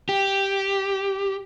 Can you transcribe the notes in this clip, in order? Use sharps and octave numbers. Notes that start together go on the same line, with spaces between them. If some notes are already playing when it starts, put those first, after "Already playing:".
G4